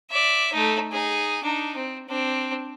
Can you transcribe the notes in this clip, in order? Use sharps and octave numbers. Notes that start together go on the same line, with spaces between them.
D5 E5
A3 D#4
D#4 G#4
D4 D#4
C4
C4 D4